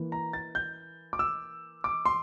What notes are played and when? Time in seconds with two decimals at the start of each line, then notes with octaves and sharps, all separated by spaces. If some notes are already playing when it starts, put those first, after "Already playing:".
Already playing: E3 A#3
0.12 A#5
0.33 A6
0.55 G6
1.13 D6
1.19 E6
1.84 D6
2.05 C6